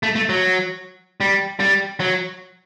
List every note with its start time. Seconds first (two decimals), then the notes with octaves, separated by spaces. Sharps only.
0.03 A3
0.16 A3
0.29 F#3
1.20 G3
1.60 G3
2.00 F#3